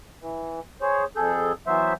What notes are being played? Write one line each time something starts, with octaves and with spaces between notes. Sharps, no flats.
E3
G#4 C5 C#5
F2 G#4 A4 G6
E3 F#3 B3 C5 E5